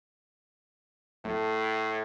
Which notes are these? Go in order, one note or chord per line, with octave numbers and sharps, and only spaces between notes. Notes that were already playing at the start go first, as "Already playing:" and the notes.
A2 A3